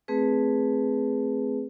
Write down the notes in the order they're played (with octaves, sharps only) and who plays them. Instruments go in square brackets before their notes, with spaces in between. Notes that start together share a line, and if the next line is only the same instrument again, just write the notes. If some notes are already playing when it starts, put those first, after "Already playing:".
[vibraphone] A3 C4 G#4 B4